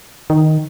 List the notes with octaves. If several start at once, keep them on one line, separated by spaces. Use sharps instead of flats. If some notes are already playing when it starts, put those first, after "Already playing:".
D#3